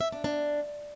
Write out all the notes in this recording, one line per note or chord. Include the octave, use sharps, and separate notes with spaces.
E5
D4
D4